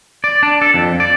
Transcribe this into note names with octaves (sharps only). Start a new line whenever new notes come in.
D5
D4
A4
F2
D5